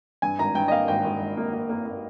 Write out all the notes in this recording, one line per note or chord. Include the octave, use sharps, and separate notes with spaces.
G2 G#5
G#1 A#5
G2 G5
D#5
A#3 F5
G#1 G5
G#1
G#1
A#3
A#3
A#3
A#3